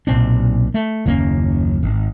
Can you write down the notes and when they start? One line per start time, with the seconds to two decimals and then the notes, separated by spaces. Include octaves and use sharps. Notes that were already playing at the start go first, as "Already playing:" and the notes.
0.07 B1 A#2 C4 D4
0.74 A3
1.06 F#1 D#2 A#3 C#4
1.83 G#1